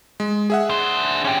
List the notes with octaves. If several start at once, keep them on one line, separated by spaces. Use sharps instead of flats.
G#3
G#4 E5 F#5
D4 C5
C#4 G4